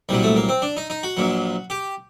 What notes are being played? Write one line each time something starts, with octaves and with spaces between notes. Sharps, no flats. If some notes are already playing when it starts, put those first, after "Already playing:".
C2 A#2 F#3 G3
A3
A#3
C4
D4
D#4
D#4
F#4
A#1 A#2 F#3
G4